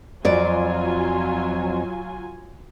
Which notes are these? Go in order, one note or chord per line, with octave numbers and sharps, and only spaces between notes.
F2 F#3 F4 D5 G#5